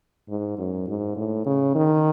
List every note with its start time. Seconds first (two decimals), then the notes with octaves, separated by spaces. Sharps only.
0.29 G#2
0.58 F#2
0.88 G#2
1.17 A2
1.46 C#3
1.75 D#3